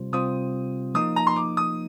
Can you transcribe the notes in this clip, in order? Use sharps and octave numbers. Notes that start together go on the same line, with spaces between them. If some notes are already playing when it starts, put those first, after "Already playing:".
Already playing: C3 G3 C4 F4 C5
C3 G3 C4 F4 C5 D#6
F3 A#3 D#4 D#6
A#5
C6
D6
D#6